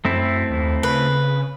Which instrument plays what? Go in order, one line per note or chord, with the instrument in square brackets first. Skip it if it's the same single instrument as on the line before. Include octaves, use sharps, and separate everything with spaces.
[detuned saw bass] F#2 [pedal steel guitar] A3 C4 E4
[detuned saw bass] D#2
[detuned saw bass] C#3 [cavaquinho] B4